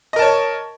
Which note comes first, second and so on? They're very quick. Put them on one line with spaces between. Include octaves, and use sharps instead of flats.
D#5 A#4 A5 C#5